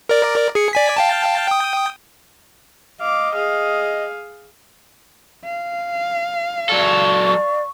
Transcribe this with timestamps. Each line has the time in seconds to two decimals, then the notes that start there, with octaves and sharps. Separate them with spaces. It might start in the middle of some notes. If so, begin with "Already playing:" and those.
0.09 A#4 D5
0.55 G#4 C#7
0.73 D5 G#5 B6
0.97 F5 G5 A5
1.48 G5 D#6
3.01 D#5 F5 D6
3.35 G#4 F5
5.44 F5
6.69 F#3 A4 D5 C#6